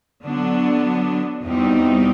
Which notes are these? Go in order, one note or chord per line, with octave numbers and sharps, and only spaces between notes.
D3 F#3 B3 D4
E2 B2 G3 C4 D#4